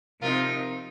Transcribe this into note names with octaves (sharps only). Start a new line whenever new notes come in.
C3 F3 C4 D#4 F4 A#4